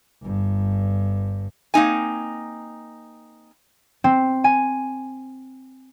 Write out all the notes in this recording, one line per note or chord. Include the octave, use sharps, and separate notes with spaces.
G1 G2
A#3 C4 D#4 G#5
C4
G#5